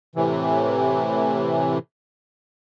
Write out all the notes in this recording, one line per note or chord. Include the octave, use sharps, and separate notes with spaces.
A2 C3 E3